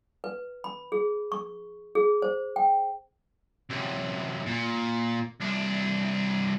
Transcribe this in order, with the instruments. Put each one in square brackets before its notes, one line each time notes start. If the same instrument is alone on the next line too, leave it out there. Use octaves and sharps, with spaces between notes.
[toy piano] B4
B5
G#4
C#6
G#4
C5
G5
[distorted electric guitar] F#2 C3
A#2
C2 D4